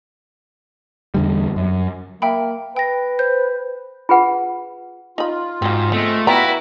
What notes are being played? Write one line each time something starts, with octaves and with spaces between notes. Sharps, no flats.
E2 D3 G3
F#2
A#3 E5 G5 B5
B4 G5 A#6
C5 G6
F4 G#4 B4 F#5
D#4 F4 B5
G#2 C4 F#4
G#3 A3 B3 C4
B3 E4 F#4 B4 G5 A#5